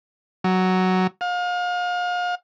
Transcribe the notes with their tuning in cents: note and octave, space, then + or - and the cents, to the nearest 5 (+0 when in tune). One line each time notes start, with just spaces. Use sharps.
F#3 +5
F5 +35